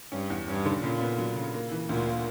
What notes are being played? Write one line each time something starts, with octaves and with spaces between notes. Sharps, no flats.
G2 C#4
E2
G2 C#4
D3
A#2 C#3
B3
F#3
C#3
A#3
E3
D2 A#2
A#3